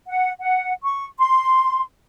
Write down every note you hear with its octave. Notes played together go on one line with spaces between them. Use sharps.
F#5
F#5
C#6
C6